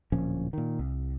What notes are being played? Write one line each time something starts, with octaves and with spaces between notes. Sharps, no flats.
D1 A#2 F3 C#4
A#2 D#3
C2